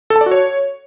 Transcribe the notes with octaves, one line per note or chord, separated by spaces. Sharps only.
A4
A5
D5
F#4
C#5